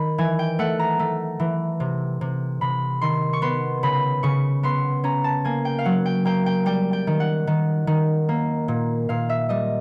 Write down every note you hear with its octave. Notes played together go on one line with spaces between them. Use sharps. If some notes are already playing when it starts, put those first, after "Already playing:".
Already playing: D#3 B5
E3 G#5
G5
A3 F#5
A#5
A3
E3
C3
C3
C3 B5
D#3 C6
C#6
B3 C6
C#3 B5
C#3 C#6
B3 C6
C#4 A#5
A5
A#3 G#5
G5
F5
F#3 F#5
G5
A#3 G5
G5
G3 G5
G5
D#3
F#5
D#3
D#3
A#3
A#2
A#2 F5
E5
G3 D#5